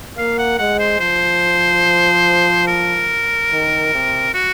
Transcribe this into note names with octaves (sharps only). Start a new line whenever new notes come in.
A#3 F5
F#5
G#3 F#5
C5
F3 C5
A#4
D#3
C3
F#4